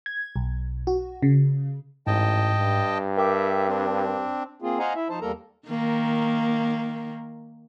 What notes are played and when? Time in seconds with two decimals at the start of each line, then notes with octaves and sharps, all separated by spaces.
0.06 G#6
0.36 B1
0.87 F#4
1.22 C#3
2.07 A1 G#2 D#5 G5 A5
2.58 G2
3.18 A#4 E5 G5 D6
3.68 C4 D4
4.62 A#3 C4 F4 G#4
4.79 C5 D#5 F5 F#5 G#5 A#5
4.95 E4 E5
5.09 F3 D#4 C5 A5
5.21 E2 G3 A#3 A4 A#4 A#5
5.68 D#3 A#3